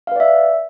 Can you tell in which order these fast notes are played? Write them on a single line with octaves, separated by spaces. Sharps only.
F5 B4 D5 E5